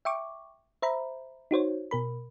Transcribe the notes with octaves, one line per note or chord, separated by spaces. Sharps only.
E5 G5 C#6 D6
C5 E5 A#5 B5
D#4 F#4 C5 C#5
B2 A#4 B5